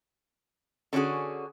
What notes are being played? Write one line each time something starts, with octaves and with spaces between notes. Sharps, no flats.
D3 C#4 D4 F#4 G#4